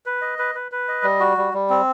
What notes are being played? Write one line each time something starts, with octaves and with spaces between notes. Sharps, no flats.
B4
D#5
B4
B4
B4
D#5
G3
F#4
G3
G3
C4